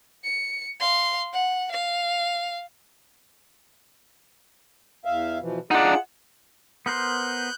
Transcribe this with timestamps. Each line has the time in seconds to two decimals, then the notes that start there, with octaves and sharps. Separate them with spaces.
0.24 C#7
0.80 F5 C6
1.33 F#5
1.71 F5
5.05 E2 E5 F5
5.40 B2 E3 F3
5.71 D4 D#4 F4 G#4 F#5
6.86 B3 A#4 C5 F#6 G6